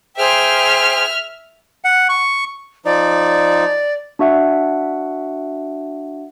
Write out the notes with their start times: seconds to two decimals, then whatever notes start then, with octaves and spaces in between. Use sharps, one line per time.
0.17 G#4 C5 E5 G5 F6
1.84 F#5
2.09 C#6
2.85 F3 D#4 D5
4.19 D4 F#4 E5 F#5